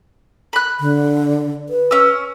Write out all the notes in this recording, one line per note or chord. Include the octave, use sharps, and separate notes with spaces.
B5 F#6
D3
B4
C#4 E6